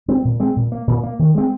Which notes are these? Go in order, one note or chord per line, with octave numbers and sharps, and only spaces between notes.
G#3 C4
A#2
G#3 C4
A#2
A#3
A#2
A#3
D#3
G#3 C4